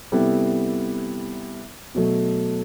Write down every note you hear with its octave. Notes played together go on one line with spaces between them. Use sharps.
C3 G3 B3 E4 A4
B2 F#3 A3